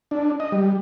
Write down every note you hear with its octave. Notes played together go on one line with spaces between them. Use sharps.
D4
D#5
G3